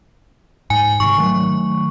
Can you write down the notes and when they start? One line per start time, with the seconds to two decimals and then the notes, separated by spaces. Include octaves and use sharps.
0.70 G#2 G#5
1.00 G#2 C3 D#3 C#6
1.18 D#3 F#3 A3